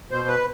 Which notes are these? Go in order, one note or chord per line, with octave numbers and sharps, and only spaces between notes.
B2 C5
B4